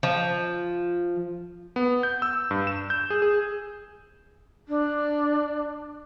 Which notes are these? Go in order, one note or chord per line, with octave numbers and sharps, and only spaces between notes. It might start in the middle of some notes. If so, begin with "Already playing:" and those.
F3
B3
G6
E6
G2
E7
G6
G#4
G#4
D4